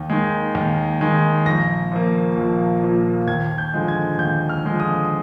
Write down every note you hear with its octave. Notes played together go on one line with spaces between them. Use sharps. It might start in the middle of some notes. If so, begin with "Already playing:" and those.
Already playing: D#2
D#3 G#3
D#2
D#3 G#3
A#1 A#6
A#2 F3 A#3
A#1
A#2 F3 A#3
D#2 G#6
G6
D3 F3 G#3
G#6
D#2 G6
F6
D3 F3 G#3
D#6